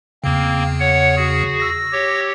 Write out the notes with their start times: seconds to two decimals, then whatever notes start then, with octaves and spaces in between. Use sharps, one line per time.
0.24 E2 C#3 A#3 C4
0.80 C#5 F#5
1.17 F#4 G#4
1.60 E6 A#6
1.92 G4 C#5